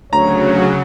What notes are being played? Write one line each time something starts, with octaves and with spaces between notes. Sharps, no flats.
D2 C#3 F#3 C#5 A#5